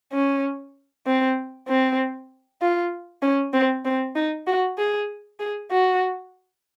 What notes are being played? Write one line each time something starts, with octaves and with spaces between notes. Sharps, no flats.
C#4
C4
C4
F4
C#4
C4
C4
D#4
F#4
G#4
G#4
F#4